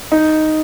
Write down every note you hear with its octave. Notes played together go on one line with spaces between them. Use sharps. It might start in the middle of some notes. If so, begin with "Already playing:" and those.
D#4